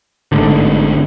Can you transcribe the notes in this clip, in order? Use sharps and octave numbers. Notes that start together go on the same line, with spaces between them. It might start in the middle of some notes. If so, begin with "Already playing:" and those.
A1 G#2 D3